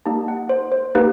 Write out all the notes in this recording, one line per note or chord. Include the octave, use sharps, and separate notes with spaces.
A#3 D#4 G4 A5
F#5
C5
C5
A#3 D#4 G4 B4